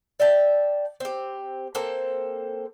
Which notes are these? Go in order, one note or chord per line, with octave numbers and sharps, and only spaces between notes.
D5 E5 G5 A5
C4 G4
A#3 C4 A4 C5